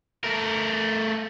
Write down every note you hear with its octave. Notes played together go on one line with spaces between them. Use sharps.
A3 A#4